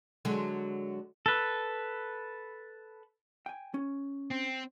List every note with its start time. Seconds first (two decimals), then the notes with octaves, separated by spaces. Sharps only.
0.25 D3 F#3 G#3
1.26 A4 B4
3.46 G5 G#5
3.74 C#4
4.31 C4